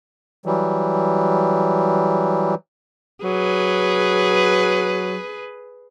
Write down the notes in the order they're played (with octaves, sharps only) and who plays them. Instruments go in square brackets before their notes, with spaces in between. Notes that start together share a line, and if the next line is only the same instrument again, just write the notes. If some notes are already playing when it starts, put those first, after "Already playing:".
[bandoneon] E3 F#3 G3
[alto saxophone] F#3 [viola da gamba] G#4 B4